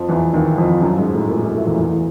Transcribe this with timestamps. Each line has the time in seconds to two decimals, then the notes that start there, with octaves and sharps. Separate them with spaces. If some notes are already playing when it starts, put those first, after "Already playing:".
Already playing: F2 F3
0.09 E2 E3
0.33 D#2 D#3
0.58 F2 F3
0.82 F#2 F#3
0.98 G#2 G#3
1.14 A2 A3
1.30 A#2 A#3
1.42 A#2 A#3
1.55 A2 A3
1.67 E2 E3
1.79 E2 E3